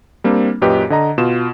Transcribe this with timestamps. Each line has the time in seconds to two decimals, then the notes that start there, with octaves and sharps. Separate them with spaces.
0.24 G3 A#3 C4 D4
0.62 F#2 A#2 G4 B4 D#5
0.90 D3 D#5 A#5
1.18 B2 F4 E7